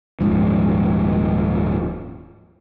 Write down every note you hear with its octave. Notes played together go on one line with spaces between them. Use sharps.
D#1 B1 G#2 F3